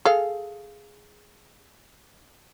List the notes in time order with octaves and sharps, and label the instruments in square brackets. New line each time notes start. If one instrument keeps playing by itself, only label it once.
[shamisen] G#4 A4 F5